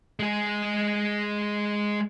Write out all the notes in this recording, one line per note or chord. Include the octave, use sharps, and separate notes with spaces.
G#3 G#4